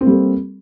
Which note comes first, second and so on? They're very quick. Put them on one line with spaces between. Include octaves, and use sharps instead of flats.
C4 A#3 G3 A4